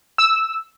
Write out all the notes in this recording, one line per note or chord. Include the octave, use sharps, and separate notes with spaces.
E6